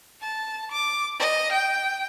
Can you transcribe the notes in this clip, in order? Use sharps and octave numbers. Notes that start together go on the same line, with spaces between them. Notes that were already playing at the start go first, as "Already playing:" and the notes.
A5
D6
D#5
G5